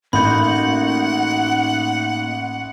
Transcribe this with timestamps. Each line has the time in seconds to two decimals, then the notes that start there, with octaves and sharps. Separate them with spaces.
0.13 A1 A#3 D#4 F#4 F#5 B5 G6